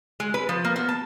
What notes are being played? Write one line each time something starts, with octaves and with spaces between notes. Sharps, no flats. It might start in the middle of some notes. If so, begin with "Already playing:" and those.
G#3
B4
F3
A#3
B3
A5